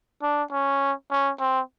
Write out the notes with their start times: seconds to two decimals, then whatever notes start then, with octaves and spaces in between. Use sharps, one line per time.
0.22 D4
0.51 C#4
1.11 C#4
1.40 C4